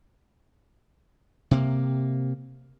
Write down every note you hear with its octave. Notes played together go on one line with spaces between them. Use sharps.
C3 A#3